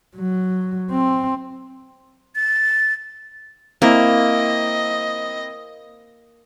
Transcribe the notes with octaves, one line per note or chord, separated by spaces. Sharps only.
F#3
C4
A6
A#3 C4 E4 D#5